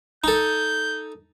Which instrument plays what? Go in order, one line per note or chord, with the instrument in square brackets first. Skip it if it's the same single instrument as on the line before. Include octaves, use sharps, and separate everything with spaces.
[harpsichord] D#4 A4 [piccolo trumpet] G6